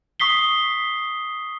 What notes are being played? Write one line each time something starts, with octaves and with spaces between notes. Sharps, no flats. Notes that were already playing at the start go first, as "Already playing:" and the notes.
C#6 D#6 B6 C7 G7